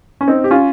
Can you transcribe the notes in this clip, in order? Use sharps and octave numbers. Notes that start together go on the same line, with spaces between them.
C#4
C4 D#4
G4
C#4 F4